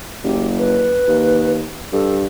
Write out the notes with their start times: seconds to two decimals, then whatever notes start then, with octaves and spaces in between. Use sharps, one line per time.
0.24 F#1 G4
0.58 B4
1.08 D#2
1.93 G2 A4